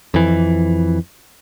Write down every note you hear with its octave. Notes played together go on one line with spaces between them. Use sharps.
F2 E3